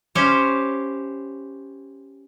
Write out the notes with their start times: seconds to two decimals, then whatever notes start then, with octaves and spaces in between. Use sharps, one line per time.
0.15 C#4 E4 G4 C5 C#5 F5